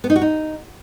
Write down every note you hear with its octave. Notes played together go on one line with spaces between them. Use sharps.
B3
D#4
F#4
D#4